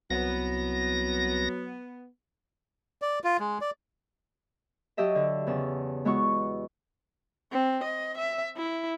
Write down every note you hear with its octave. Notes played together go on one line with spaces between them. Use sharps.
C2 F#3 B3 A#6
D5
F4
G#3
D5
F#3 G4 D#5 E5 A5
D3
E2 C#3 A5
G#3 B3 E4 F#4 C#6
C4
D#5
E5
E4